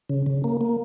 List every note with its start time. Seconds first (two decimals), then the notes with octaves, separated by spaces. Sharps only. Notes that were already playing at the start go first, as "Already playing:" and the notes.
0.10 C#3
0.26 C#3
0.44 A#3
0.61 A#3